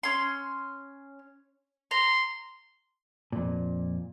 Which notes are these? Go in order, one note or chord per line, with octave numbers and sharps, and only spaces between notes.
C#4 C6
A#5 C6
F2 A#2